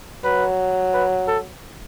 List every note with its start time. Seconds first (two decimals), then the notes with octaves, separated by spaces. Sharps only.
0.24 F#3 B4
0.94 B4
1.28 A4